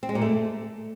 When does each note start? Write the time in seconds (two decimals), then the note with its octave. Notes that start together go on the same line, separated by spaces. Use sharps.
0.03 C4
0.09 G#3
0.15 A#2
0.21 A3